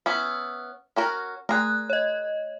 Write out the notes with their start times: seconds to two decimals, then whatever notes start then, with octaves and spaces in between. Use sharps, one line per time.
0.06 B3 C#4 E4
0.96 C#4 F#4 A#4
1.49 A3 G#4 A#4 F#6
1.90 C#5 D#5